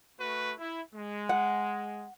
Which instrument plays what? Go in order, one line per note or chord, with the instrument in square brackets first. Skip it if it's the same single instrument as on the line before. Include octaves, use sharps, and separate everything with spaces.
[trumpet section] A3 F#4 B4
E4
G#3
[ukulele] F#5